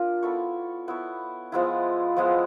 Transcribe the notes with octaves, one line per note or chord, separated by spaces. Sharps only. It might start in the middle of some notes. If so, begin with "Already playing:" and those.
Already playing: D4 F4 A#4
B3 E4 A4 C#5
B3 E4 A4 C#5
F3 G#3 B3 E4
F3 G#3 B3 E4